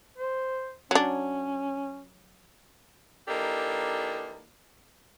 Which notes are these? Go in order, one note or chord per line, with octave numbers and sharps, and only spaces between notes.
C5
F#3 C#4 D4
E3 A#3 D4 D#4 G4 A4